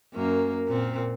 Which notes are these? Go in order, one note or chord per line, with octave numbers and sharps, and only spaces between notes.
F#2 A#3
A#2 C4